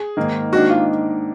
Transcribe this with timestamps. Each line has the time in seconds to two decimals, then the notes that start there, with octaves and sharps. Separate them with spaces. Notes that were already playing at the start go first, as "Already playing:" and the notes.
Already playing: G#4
0.17 G#2 D#3 A#3
0.53 G#2 D#3 A#3 D4 F#4
0.70 F4